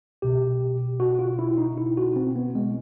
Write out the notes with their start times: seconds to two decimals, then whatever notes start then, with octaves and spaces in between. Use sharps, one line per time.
0.22 C2 B2 G4
1.00 F#4
1.19 F4
1.39 E4
1.58 D#4
1.78 E4
1.97 F#4
2.16 C4
2.36 B3
2.55 G#3